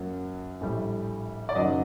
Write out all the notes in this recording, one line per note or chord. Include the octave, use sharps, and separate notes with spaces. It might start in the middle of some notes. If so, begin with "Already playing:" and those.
Already playing: F#2 F#3 A#3
A#1 A2 G3
D5
F#1 F#2 D#3 F#3 D#5